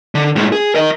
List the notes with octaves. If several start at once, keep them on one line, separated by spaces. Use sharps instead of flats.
D3
A2 G#3
G#4
A#4 D#5